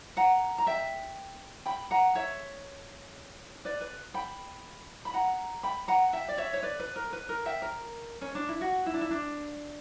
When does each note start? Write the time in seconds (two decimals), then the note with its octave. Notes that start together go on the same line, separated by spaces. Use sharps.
0.17 F#5 A#5
0.58 A#5
0.66 E5 G5
1.66 G5 B5
1.91 F#5 A#5
2.15 C#5 E5
3.65 B4 D5
3.81 B4
4.14 G5 B5
5.05 B5
5.14 F#5 A#5
5.63 G5 B5
5.88 F#5 A#5
6.13 E5 G5
6.28 D5
6.38 C#5 E5
6.53 C#5
6.63 B4 D5
6.80 B4
6.96 A#4
7.13 B4
7.29 A#4
7.46 E5 G5
7.62 A#4
8.21 C#4
8.35 D4
8.48 E4
8.61 F#4
8.86 E4
8.94 D4
9.01 E4
9.11 D4